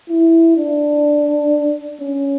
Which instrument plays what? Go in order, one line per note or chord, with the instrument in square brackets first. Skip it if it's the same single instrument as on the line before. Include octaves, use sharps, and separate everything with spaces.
[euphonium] E4
D4
C#4